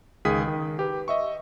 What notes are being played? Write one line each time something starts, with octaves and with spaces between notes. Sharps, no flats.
C#2 D#3 G#4 D#6 B6
D#3
G4 B4
D#5 E5 C#6